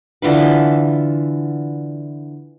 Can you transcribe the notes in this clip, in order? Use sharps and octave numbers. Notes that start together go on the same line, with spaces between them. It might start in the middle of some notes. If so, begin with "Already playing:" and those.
D3 E3 F4 B4